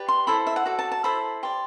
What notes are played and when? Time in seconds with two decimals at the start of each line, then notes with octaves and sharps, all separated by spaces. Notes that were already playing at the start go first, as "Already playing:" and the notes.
Already playing: G4 B4 D5
0.08 C6
0.27 E4 A4 C5 B5
0.47 E5
0.56 F#5
0.66 F#4 A4 D5
0.79 A5
0.92 A5
1.04 E4 A4 C5 B5
1.43 G4 D5 C6